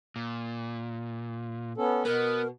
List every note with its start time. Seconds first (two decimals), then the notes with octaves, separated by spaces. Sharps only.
0.16 A#2
1.78 B3 C#4 A4
2.05 B2 B3 A#4